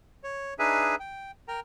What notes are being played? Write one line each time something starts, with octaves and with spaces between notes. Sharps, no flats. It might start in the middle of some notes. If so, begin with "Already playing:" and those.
C#5
D4 D#4 G#4 B4 E5 G#5
G5
A#4 G5 A#5